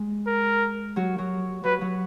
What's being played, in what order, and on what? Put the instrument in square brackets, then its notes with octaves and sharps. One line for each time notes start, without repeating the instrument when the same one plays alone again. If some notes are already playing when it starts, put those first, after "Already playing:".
Already playing: [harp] G#3
[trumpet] A#4
[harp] F#3 F#4
F#3 F#4
[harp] F#3 F#4 [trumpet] B4
[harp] F#3 F#4